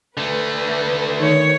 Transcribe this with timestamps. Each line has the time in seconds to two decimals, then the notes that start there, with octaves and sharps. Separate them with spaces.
0.17 D3 A3 B4
1.20 D#3 C#5